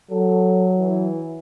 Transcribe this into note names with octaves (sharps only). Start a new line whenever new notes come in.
F#3 A4
E3